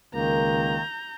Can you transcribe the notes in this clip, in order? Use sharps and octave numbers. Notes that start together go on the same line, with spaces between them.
C#2 D#3 A#3 A#5 G6